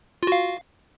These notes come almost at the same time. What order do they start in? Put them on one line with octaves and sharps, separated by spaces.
F4 F#4 F5